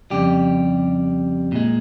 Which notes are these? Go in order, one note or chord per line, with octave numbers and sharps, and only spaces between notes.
F2 C#3 G3 G4
A#2 G#3